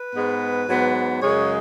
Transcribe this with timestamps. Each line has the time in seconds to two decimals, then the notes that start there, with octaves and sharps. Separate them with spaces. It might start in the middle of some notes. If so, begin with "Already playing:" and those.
Already playing: B4
0.13 G#2 G#3 B3
0.68 G#2 F#3 B3
1.21 F#2 C#3 G#3 C#5